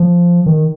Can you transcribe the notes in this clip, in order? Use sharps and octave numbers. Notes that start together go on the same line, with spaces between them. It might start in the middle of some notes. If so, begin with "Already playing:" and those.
Already playing: F3
D#3